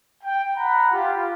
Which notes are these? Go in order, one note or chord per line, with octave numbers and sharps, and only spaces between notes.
G5
F#5 A#5 B5
F4 G4